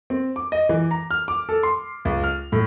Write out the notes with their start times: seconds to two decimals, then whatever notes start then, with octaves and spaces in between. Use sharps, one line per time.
0.10 C4
0.36 D6
0.52 D#5
0.69 E3
0.91 A#5
1.11 F6
1.28 D6
1.49 A4
1.63 C6
2.05 C#2
2.24 F6
2.52 A2